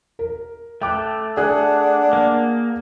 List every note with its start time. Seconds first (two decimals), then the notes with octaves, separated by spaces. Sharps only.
0.19 A#4
0.82 A3 G5 D6 F#6
1.37 D4 G#4 F#5 F#6
2.13 A#3